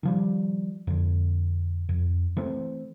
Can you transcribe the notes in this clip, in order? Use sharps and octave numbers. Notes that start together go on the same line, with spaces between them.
D#3 F3 G3
F2 D3
F2
E3 A3 C4